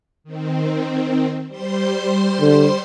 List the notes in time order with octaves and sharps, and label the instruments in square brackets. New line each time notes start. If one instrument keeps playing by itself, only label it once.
[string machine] D#3 C4
G3 C5 C6
[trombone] D3